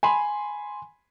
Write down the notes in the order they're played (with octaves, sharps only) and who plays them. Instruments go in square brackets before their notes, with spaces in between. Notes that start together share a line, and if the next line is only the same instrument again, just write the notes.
[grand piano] G#5 B5 C6